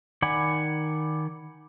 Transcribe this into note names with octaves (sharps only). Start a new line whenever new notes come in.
D#3 D5 F#5 G#5 B5